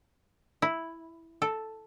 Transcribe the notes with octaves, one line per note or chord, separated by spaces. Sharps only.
E4
A4